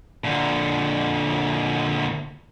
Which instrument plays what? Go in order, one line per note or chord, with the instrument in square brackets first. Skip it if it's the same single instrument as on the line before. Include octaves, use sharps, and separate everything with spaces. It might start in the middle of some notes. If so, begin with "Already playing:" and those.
[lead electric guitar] A#2 D3